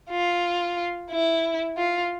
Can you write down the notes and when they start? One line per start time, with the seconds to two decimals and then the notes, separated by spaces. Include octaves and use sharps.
0.10 F4
1.10 E4
1.77 F4